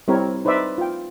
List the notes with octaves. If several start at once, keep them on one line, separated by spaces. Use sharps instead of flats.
G3 C4 E4 A#4 C#5
D#4 B4 C5 D5 E5
F4 G5